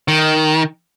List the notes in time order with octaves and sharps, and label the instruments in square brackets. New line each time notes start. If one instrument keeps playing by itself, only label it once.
[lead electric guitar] D#3